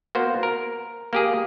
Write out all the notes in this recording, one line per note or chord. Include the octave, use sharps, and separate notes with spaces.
A#3 B3 F#4 C5
A#4
A#3 G4 G#4